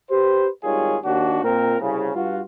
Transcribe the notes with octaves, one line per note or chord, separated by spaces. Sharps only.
G4 B4 C5
G#1 D#3 G3 F4 G#4 C#5
D#2 D4 F#4
A#2 C4 A#4
C2 C#3
G2 F4 F#4